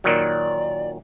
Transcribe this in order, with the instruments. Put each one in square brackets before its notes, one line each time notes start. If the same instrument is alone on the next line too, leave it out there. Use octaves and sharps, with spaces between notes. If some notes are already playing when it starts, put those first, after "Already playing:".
[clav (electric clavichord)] A#2 D#3 F#3 [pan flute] D5